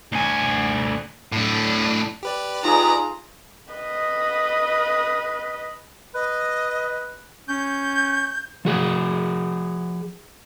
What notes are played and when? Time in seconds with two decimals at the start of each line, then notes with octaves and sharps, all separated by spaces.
0.12 D2 G#5
1.32 A2 D4
2.23 G4 B4 D5
2.64 D#4 F4 G#4 A#5
3.73 B4 D#5
6.14 B4 D#5
7.48 C#4 G6
8.65 F3 F#4 G#4 F#5